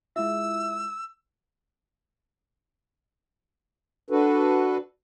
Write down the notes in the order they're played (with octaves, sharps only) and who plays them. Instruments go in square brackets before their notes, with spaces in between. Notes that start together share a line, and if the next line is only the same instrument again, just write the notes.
[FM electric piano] G#3 E4 F4 [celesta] E5 [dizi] E6
[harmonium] D4 F#4 A4 B4